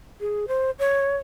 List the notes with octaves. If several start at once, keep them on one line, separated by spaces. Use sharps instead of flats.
G#4
C5
C#5